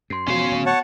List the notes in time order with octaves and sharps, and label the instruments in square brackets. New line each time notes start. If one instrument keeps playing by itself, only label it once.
[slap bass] F#2 [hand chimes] C6 C7
[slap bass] E1 A2 F3 [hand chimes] B3 F#4 [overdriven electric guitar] C#4 F5
[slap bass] D1
[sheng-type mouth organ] C#5 F#5 A5